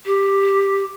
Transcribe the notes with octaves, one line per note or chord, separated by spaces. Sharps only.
G4